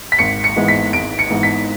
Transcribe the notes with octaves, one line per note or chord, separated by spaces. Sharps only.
B6
G#1 C#7
C#7
G#2 E3 G#3 B3
B6
G#1 D7
C#7
G#2 E3 G#3 B3
B6